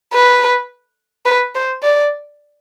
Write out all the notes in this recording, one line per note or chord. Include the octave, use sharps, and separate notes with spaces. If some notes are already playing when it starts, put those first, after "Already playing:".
B4
B4
C5
D5